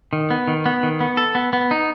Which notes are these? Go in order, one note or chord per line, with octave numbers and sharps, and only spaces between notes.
D#3
B3
D#3
B3
D#3
B3
A4
B3
B3
D#4